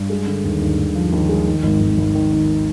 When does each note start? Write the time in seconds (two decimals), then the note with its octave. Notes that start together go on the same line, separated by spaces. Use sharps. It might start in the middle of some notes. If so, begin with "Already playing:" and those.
Already playing: G2
0.09 G#3
0.26 D3
0.44 D#2
0.61 D#2
0.78 D#2
0.95 F3
1.12 D#2
1.29 G#3
1.47 D#3
1.63 G#1
1.81 G#1
1.98 G#1
2.15 D#3
2.32 D#3